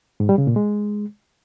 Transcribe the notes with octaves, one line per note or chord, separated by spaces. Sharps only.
G#2
G3
C#3
A#2
G#3